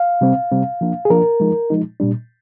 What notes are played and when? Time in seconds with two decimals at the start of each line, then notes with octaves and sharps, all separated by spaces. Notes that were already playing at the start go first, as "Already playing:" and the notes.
Already playing: F5
0.21 C3 G3 C4
0.51 C3 G3 C4
0.81 F3 A#3 D4
1.05 G#4
1.10 F3 A#3 D4 A#4
1.40 F3 G#3 D#4
1.70 F3 G#3 D#4
2.00 A#2 G3 D4